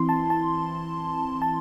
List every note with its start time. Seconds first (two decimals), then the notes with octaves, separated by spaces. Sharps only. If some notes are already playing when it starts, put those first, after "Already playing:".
Already playing: E3 C4 E4 C6
0.09 A5
0.30 A5
1.42 A5